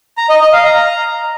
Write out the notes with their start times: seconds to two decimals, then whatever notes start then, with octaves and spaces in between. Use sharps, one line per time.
0.18 A#5
0.29 D#5
0.41 D#5
0.53 F5
0.65 A#5